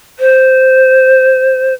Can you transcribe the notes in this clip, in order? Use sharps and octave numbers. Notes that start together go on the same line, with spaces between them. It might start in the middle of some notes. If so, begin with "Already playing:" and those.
C5